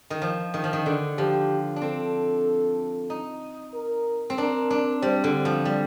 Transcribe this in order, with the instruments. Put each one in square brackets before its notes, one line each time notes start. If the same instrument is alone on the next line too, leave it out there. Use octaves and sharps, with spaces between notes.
[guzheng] D#3
F3
D#3
F3
D#3
D3
[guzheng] F3 [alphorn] G4
[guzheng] D4
[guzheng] C4 [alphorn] A4
[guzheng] D#4
[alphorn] A#4
[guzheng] C4
[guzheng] D4 [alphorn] A#4
[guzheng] D4
[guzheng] G3 [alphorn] C5
[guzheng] D3
F3
G3